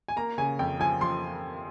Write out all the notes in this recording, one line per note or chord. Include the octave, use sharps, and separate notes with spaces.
G#5
A#3 A#5
C#3 G#5
F2 G5
F3 G#5
F3 C6